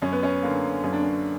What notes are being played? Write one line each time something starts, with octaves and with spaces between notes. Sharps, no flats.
F#2 C#4
B3
C#4
D3 A#3
F#2 C#4
D4
C#4